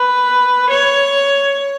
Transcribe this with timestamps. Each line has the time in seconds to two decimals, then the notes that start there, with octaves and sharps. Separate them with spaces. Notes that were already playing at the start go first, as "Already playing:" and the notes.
Already playing: B4
0.70 C#5